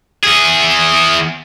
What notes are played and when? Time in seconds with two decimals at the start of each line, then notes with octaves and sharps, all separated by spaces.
0.23 E2 G#4